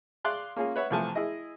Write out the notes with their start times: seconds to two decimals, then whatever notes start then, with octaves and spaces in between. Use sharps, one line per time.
0.24 G#4 D5 F5 C6 F#6
0.56 A#3 C#4 F4 G#4
0.76 B4 C#5 E5 F#5
0.90 C2 E3 F3 A3 G#5 A5
1.15 E4 G#4 D#5